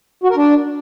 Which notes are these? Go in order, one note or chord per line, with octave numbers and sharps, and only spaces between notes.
F#4
A#4
D4